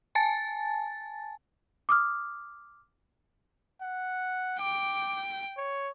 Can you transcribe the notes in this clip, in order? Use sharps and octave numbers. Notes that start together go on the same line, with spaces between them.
G#5 A5 A6
D6 D#6 F6
F#5
G5 D6
C#5